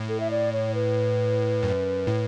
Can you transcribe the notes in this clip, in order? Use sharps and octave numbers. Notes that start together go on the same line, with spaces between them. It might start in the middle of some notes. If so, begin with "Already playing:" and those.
Already playing: A2
A4
E5
D5
C#5
B4
F#2
A2